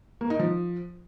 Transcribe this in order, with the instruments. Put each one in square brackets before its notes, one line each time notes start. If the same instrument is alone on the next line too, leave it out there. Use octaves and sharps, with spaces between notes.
[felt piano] A#3
D#4
F3